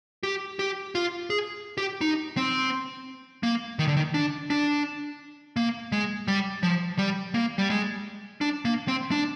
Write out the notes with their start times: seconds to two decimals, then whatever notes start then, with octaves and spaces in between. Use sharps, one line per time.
0.23 G4
0.59 G4
0.95 F4
1.30 G#4
1.78 G4
2.01 D#4
2.37 C4
3.43 A#3
3.79 D#3
3.87 D3
3.97 D#3
4.14 D4
4.50 D4
5.56 A#3
5.92 G#3
6.28 G3
6.63 F3
6.98 G3
7.34 A#3
7.58 G3
7.70 G#3
8.41 D4
8.65 A#3
8.88 C4
9.11 D4